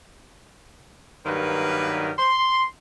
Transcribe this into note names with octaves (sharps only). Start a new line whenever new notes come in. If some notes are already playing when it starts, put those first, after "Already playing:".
G2 D#3 F#3 G3 A#3 B4
C6